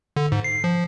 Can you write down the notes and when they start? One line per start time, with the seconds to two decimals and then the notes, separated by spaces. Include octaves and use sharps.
0.16 D3
0.32 G#2
0.44 C7
0.64 F3